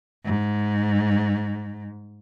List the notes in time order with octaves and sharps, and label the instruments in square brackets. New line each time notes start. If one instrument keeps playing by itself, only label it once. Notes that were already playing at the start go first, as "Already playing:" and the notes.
[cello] G#2